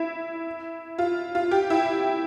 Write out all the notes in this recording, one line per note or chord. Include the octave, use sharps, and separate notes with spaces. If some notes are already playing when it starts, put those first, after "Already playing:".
Already playing: E4
F4
F4
G4
E4